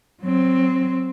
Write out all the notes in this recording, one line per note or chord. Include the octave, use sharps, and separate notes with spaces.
F#3 C4